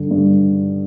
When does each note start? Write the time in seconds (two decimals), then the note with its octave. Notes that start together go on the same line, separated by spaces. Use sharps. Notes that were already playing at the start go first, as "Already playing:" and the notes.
Already playing: G2 D3
0.11 G2